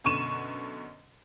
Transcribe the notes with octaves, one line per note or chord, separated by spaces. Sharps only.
F#2 B2 D3 C#6 D#7 E7